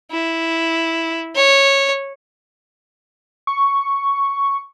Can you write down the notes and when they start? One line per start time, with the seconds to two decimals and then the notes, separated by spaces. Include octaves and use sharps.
0.11 E4
1.35 C#5
3.47 C#6